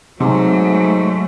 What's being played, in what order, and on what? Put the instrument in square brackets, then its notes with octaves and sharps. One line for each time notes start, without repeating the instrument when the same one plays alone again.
[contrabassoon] G#2 [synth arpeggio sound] C3 [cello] F#3 A3